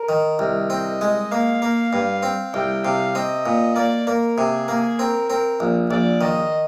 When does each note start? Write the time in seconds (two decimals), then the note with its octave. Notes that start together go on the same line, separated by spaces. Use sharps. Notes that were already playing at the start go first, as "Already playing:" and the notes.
Already playing: A#4
0.09 D#3
0.39 C2
0.70 C4 D#5
1.01 G#3
1.32 A#3 F5
1.62 A#3
1.93 G2
2.23 C4
2.53 C2 G5
2.84 C3 F5
3.15 C4 D#5
3.46 A#2
3.76 A#3 D5
4.07 A#3 A#4
4.38 C3 G#4
4.68 A#3
4.99 C4 A#4
5.29 C4 A#4
5.60 A#1
5.90 A#1 D5
6.21 D#3 D#5